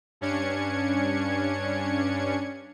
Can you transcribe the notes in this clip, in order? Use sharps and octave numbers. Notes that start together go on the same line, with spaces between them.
G2 C#4 D4 G#6 C#7